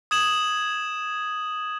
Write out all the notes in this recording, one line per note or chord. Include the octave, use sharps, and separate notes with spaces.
D#6 G#6 E7 F#7